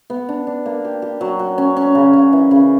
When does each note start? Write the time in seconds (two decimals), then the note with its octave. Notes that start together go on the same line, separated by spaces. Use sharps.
0.10 B3
0.29 D4
0.47 D4
0.66 A#3
0.85 G4
1.02 G4
1.21 F#3
1.39 F#3
1.58 C#4
1.77 C#4
1.95 C#3
2.13 C#3
2.33 E3
2.51 C#3